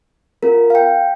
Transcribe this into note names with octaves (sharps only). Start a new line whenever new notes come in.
C4 F4 A#4
F5
G5